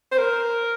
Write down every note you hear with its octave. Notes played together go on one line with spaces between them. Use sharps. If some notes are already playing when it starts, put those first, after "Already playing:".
C5
A#4